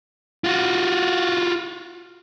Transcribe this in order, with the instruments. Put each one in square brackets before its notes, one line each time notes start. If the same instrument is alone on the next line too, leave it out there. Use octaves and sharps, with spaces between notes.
[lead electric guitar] F4 F#4